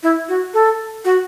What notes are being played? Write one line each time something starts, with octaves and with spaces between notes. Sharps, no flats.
E4
F#4
A4
F#4